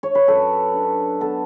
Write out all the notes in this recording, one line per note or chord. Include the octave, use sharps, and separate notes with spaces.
C#5
B4
F#2 A4
D4
B3 A4